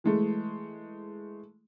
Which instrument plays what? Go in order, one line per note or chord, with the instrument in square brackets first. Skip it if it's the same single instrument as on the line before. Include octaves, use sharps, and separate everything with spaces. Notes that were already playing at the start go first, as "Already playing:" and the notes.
[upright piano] E3 G#3 A3